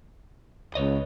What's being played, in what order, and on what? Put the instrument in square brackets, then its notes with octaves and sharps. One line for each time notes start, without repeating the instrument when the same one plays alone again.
[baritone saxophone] C#2 [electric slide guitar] B4 C#5 D#5